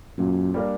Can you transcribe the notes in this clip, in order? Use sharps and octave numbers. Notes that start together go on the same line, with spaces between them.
F#2 A#2
G3 A#3 D4